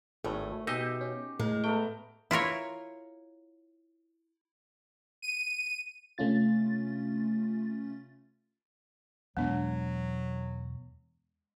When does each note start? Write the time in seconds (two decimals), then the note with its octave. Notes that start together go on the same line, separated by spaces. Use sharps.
0.24 G#1 A2 A3 G#5
0.67 B2 D#4 G4 D#5 E5
1.01 C#4
1.40 A2 G#3 A#4
1.64 A3 B3 G5 A#5
2.31 E4 F4 A#4 C#5
5.22 D#7
6.18 C3 A3 C#4 F4 A6
9.37 E2 B2 F#3 G#3 B3 D4